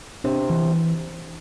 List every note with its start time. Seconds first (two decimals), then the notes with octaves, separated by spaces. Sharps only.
0.24 C3 D4
0.50 E3